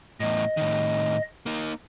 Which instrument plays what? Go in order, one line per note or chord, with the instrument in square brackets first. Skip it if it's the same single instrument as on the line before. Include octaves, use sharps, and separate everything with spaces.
[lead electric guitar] E2 A2 [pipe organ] D#5
[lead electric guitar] A2 D#3
A#3 D#4